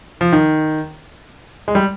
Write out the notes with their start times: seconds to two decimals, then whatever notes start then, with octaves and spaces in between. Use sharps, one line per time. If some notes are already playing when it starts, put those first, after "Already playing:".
0.21 F3
0.32 D#3
1.68 G#3
1.75 G3